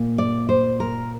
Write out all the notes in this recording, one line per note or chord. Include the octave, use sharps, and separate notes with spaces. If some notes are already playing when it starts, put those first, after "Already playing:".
Already playing: A#2 A#3
D5
C5
A#4